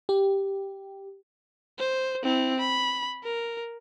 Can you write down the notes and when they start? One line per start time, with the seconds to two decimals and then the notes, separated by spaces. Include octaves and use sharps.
0.09 G4
1.79 C5
2.23 C4 E4
2.60 B5
3.24 A#4